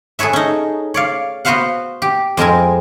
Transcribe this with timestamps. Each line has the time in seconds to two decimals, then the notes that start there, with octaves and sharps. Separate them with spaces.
0.19 G#4 A4 B4 C#5 E5
0.33 C#4 D#4
0.94 C#5 D5 F5
1.45 B3 F#4 B4 C5 F5 F#5
2.02 G4
2.37 F2 G#3 C4 A#4 G#5